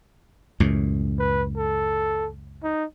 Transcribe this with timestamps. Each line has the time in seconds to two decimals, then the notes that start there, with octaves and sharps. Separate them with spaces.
0.60 C#2 F#2 A2
1.19 B4
1.57 A4
2.63 D#4